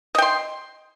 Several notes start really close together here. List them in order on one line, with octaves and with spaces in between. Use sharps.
D#5 G5 C6